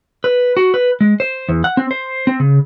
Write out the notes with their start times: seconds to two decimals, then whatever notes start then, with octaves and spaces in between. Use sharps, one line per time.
0.24 B4
0.57 F#4
0.74 B4
1.01 G#3
1.20 C5
1.49 E2
1.64 F#5
1.77 C4
1.91 C5
2.27 C4
2.40 C#3